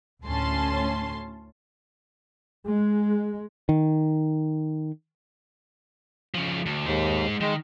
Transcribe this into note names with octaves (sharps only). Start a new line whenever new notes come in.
D2 A2 C#4 A5 C6
G#3
D#3
C#3 F3
D2
D#2 G#3 C5
D#3 G#3